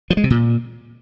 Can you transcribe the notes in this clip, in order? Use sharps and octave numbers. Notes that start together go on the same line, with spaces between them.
F3
G#3
C3
A#2